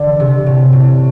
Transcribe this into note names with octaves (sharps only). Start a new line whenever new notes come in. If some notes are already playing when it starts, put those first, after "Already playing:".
Already playing: D3
C3
A2
A2